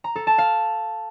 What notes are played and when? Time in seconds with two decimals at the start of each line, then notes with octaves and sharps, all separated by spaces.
0.04 A#5
0.16 A4
0.27 A5
0.38 F5